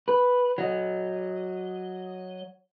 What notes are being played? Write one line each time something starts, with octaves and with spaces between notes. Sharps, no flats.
B4
F#3 D#5